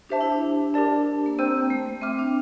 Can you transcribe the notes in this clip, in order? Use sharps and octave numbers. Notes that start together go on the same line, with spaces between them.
D4 G4 C5 E5 A5
E4
D4
G4 A#4 D5 A5
A#3
C4 C5 G5 A#5 E6 G6
A#3
A3
C4 E5 G5 D6 F6
D4